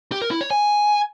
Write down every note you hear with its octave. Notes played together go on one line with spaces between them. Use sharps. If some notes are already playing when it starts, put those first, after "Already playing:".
G4
A#4
E4
C#5
G#5